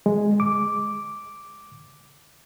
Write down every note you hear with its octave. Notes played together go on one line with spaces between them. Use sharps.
G#3
D6